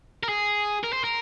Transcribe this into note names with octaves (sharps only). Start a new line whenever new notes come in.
A#4
G#4
A#4
C5
A#4